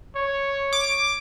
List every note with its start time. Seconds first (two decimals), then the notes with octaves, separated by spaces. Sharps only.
0.16 C#5
0.73 D6